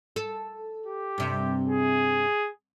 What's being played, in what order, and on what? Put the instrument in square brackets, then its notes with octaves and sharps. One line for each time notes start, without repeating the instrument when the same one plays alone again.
[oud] A4
[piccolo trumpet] G4
[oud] G2 C3
[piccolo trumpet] G#4